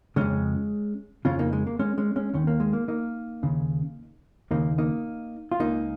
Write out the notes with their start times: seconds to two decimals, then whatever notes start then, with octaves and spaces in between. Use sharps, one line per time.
0.16 F2 C#3 G#3 C#4
1.25 F2 C#3 C#4 F4
1.39 A#3 D#4
1.53 G#3
1.67 A#3
1.79 G#3 C#4
1.98 G#3 C#4
2.16 G#3 C#4
2.34 D#2 D#3 C#4
2.47 A#3
2.60 G#3
2.73 A#3
2.88 A#3 D#4
3.43 D#2 C#3
4.51 D#2 C#3 A#3 D#4
4.78 A#3 D#4
5.52 F4
5.60 C#2 C#3 A#3 D#4